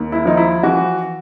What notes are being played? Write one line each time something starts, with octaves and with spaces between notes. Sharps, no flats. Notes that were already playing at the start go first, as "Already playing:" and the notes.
Already playing: D#2
E4
F3 D#4
E4
E3 F#4